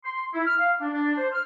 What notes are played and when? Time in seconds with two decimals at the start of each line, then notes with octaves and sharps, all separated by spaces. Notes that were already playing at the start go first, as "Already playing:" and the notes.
0.04 C6
0.34 E4
0.46 F6
0.59 F5
0.80 D4
0.94 D4
1.17 C5
1.32 F6